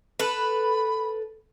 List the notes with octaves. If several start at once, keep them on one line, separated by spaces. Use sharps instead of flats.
A4 B4 B5